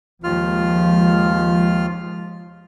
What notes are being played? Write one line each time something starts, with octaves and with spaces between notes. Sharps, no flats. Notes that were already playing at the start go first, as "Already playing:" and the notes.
D#2 F3 G#3 F4 F6